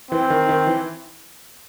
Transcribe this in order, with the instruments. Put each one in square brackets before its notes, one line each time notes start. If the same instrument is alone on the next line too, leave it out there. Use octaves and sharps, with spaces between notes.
[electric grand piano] E3 [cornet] C4
[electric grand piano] D#3
D#3
E3